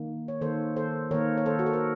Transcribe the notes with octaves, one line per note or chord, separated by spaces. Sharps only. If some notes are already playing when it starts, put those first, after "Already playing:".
Already playing: D#3 A#3
C#5
D#3 A#3 A4 C5
A4 C5
D#3 A#3 A#4 C#5
C#5
A4 C5
F#4
A4
A#4